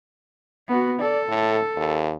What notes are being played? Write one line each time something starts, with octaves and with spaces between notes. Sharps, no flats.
B3 F#4
A4 D5
A2
D#2